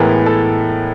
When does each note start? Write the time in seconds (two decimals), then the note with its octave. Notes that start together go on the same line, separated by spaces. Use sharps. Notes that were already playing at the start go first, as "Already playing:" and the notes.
Already playing: A2 E3 G#3 B3 A#4
0.26 A4